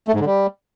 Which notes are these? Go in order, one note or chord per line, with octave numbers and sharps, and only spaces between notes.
A3
G#2
D3
G3